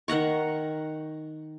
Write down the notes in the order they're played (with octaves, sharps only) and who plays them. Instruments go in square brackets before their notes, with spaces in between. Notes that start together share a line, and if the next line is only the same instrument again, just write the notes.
[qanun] D#3 F#5 A#5 C#6